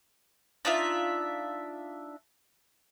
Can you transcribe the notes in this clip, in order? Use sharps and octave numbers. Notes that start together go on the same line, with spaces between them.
D4 D#4 F4 E5